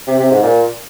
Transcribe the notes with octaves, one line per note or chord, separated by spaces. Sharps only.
C3
C3
G#2
A#2